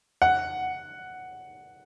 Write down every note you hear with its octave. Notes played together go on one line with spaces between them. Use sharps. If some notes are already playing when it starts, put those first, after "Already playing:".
F#5